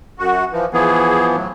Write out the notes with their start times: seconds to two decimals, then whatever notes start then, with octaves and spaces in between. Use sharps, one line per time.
0.19 F#2 F#4
0.52 E3 F3
0.73 E3 F3 B3 G#4
1.34 A2 F#3